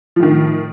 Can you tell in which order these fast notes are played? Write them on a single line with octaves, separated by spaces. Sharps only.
F3 A2 D#3